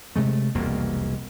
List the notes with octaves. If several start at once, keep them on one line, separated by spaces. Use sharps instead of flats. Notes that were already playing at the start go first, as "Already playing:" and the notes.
C3 G#3 A3
E1 C2 F2 A#3